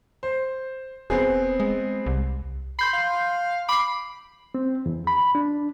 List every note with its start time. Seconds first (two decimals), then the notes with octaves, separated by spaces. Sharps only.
0.23 C5
1.10 E1 B3 C4 G#4
1.60 G#3
2.06 C2
2.79 B5 C6 G6 C7
2.93 F5
3.69 B5 D6 C7
4.55 C4
4.86 E2
5.07 B5
5.35 D4